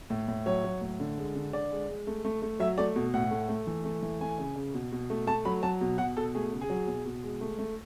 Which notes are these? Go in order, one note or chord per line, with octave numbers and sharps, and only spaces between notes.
A2
A2
F#3 C#5
F#3
A2
D3
G#3
D3
D3 D5
G#3
G#3
A3
A3
A3
F#3 E5
A3 D5
B2
A2 F#5
A3
A3
E3
A3
E3
A3 G#5
C#3
C#3
B2
B2
A3
A3 A5
F#3 B5
F#3 A5
B2
B2 F#5
B2 A4
A3 G#4
C#3
G#4
F#3
B2
B2
G#3
A3
A3